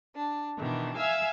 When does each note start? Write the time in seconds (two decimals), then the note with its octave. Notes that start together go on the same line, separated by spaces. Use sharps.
0.16 D4
0.59 B2 D#3 E3 D4
0.97 E5 F5 G#5 E6